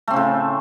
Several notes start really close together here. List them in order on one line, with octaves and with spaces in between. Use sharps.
A3 C4 C#3 A2